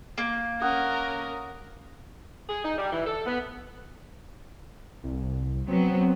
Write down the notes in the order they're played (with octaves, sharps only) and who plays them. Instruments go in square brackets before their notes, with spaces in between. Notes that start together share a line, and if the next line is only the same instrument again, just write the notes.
[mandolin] A#3
[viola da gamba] C#4 A#4 [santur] F#5 D#6
[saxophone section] G#4
D#4
G3
E3
A4
B3
[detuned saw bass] C2
[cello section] F#3 B3 [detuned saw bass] C4